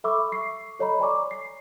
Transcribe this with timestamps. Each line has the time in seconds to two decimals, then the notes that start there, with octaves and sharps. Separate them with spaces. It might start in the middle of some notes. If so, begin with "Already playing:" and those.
0.04 A4 E5 B5 C#6 D6 E6
0.32 C#6 C7
0.80 A4 C#5 D#5 A#5 B5
0.99 C#5 D5 G#5 A#5 C#6 D6
1.31 C7